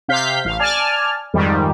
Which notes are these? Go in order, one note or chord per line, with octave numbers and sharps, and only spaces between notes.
C3 F5 G6 B6
A1 F5
D5 G#5 A5 F6
F2 G#2 D#3 G3